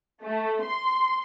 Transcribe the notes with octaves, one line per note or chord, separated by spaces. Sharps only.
A3
C6